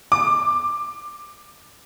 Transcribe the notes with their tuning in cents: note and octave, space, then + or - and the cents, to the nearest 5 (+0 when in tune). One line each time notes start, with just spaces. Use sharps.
D6 +15